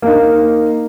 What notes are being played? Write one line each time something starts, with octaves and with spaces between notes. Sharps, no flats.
A#3 D#4